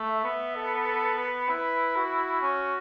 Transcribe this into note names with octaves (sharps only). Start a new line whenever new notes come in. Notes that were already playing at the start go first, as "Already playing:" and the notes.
Already playing: A3
E5
B3
A4
A4
B4
E4 B4
F#4
C#4